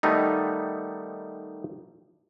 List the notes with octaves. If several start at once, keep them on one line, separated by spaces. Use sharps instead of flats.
D#3 G3 A3 B3 D#4